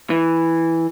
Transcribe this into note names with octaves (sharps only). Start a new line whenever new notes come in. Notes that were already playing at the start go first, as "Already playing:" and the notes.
E3